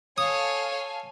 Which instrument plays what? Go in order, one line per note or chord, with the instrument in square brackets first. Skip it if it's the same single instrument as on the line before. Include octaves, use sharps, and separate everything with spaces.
[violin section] A4 F5 G#5 [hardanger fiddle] C#5 [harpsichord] D#6